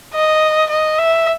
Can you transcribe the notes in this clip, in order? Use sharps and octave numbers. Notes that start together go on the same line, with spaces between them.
D#5
D#5
E5